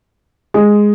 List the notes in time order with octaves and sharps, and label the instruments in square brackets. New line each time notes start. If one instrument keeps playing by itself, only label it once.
[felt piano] G#3